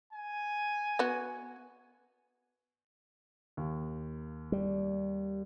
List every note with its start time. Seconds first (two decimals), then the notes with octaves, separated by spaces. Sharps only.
0.13 G#5
0.99 B3 F#4
3.57 D#2
4.52 G3